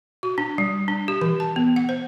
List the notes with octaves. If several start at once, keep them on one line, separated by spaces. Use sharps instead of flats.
F#4
D4
G3
D4
G4
E3
A5
B3
F#5
C5